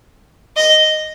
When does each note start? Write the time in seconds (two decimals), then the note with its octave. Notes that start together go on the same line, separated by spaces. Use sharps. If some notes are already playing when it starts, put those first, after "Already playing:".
0.56 D#5